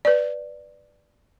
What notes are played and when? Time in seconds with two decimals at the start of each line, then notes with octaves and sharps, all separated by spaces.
0.05 B4 D5